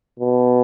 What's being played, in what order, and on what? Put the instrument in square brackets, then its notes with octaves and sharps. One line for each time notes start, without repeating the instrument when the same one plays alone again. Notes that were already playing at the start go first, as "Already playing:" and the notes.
[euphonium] B2